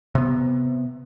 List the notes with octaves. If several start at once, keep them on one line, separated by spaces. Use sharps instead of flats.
C3 B3